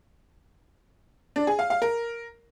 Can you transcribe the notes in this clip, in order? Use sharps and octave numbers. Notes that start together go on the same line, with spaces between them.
D4
G#4
F5
F5
A#4